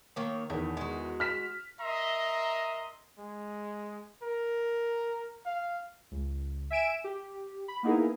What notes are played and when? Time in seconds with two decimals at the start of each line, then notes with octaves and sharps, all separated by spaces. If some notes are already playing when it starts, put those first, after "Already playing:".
0.16 D#3 A#3 C#5
0.50 E2 A2 D#3
0.77 G#3 F#4
1.20 F6 B6 E7
1.82 A#4 D#5 E5 A#5 C6
3.18 G#3
4.22 A#4
5.46 F5
6.11 C#2
6.70 E5 G#5 D7 E7
7.04 G4
7.68 B5
7.83 A#3 B3 D#4 E4 G#4 A#4